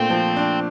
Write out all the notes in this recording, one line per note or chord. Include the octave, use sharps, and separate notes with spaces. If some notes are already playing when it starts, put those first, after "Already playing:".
Already playing: A#2 A3 C4 D4
F3
D4